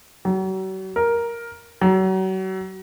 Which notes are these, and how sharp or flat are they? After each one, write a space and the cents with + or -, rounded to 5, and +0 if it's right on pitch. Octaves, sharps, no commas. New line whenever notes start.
F#3 +40
A#4 +5
F#3 +35